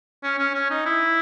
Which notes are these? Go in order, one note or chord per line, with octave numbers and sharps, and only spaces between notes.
C#4
C#4
C#4
D#4
E4